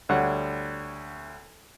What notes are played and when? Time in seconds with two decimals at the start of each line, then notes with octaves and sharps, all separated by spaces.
0.09 D2 G3 C#5 F#5